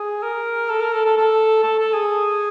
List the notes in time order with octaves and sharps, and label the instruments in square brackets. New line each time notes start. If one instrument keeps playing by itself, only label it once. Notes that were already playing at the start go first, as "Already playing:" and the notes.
Already playing: [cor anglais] G#4
A#4
A4
A#4
A4
A4
A4
A4
A4
G#4